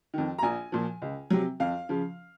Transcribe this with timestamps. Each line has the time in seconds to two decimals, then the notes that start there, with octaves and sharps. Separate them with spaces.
0.14 F2 D#3
0.38 A#5
0.43 A#1 G#5
0.72 A#2 F3
1.02 C#2
1.30 C3 F#3
1.60 F2 F5
1.89 C#3 F3